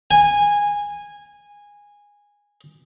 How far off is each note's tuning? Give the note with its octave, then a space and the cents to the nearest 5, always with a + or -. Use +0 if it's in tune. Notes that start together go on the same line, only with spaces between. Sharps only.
G#5 -15